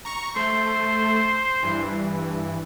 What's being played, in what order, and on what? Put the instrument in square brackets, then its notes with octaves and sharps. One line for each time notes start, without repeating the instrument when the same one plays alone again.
[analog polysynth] A#5 C#6
[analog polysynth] A3 [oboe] C5
[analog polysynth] G2 E3